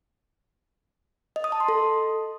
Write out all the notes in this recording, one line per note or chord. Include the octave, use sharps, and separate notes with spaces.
D#5
D#6
A5
C6
A4